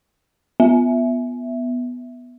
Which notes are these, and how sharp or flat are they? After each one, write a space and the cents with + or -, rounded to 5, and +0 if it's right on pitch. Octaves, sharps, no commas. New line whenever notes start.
B3 +0 E5 +0